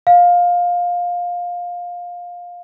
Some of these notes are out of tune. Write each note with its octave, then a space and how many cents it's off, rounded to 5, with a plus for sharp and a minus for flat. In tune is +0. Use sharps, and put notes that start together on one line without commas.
F5 +15